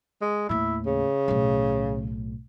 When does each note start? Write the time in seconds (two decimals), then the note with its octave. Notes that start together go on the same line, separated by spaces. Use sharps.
0.22 G#3
0.49 D#2 A2 E4
0.86 C#3
1.28 B1 A2